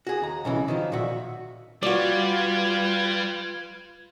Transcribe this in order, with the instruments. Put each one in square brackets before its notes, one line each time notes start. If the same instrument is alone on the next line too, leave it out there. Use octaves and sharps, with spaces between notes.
[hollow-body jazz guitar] F#4 G#4
D#2 A#5
B1 C#3 E3
D#3 F3 F#3
A#2 F#4 E5
[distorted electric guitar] G3 [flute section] F4 B4 G#6 [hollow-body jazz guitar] F#4 D5